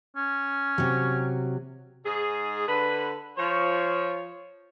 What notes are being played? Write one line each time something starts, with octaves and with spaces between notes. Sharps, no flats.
C#4
C3 F#3
G#2 G#4
D3 B4
F3 C#5